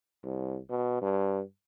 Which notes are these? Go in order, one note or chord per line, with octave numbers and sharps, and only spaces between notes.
C2
B2
G2